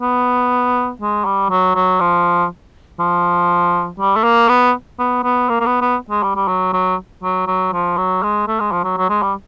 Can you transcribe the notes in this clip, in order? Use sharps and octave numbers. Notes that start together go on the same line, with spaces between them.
B3
G#3
G3
F#3
F#3
F3
F3
G3
A3
A#3
B3
B3
B3
A#3
A#3
B3
B3
G#3
G3
G3
F#3
F#3
F#3
F#3
F3
F#3
G#3
A3
G#3
F3
F#3
F#3
G#3
G3